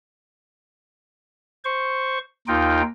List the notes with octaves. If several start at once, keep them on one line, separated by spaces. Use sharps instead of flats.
C5 C#6
D#2 D#4 F4 G5